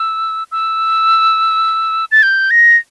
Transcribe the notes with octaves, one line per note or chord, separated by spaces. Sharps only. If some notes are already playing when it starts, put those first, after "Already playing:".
Already playing: E6
E6
A6
G6
A#6